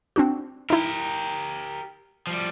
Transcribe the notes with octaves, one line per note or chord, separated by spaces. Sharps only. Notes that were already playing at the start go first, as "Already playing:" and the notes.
C4 D4 F#4
D#4 E4 G4 A#4
F3 G3